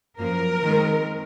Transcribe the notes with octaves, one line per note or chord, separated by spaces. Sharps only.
F#2 F3 A#3 A#4
D#3 G#3 C4